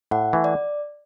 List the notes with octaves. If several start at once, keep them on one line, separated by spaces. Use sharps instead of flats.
A2 F#5
E3 A3
D5